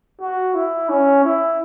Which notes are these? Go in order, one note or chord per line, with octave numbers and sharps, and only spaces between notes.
F#4
E4
C#4
E4